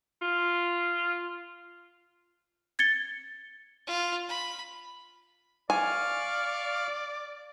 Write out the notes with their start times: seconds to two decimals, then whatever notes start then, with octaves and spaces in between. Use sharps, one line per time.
0.22 F4
2.79 G#6 A6 C#7 G7
3.87 F4
4.28 B5
5.70 D5 F5 G#5 C#6 F6